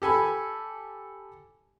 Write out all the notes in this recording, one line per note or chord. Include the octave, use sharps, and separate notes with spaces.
G4 A4 G#5 B5